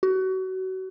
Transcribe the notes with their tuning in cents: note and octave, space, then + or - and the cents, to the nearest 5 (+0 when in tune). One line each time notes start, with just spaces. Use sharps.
F#4 +30